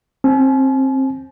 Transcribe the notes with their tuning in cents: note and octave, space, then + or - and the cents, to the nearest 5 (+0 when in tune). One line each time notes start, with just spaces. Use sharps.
C4 +25 G#5 +45